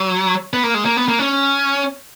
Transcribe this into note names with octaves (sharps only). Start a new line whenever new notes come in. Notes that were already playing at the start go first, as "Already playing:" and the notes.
Already playing: F#3
B3
A#3
G#3
A#3
B3
A#3
C#4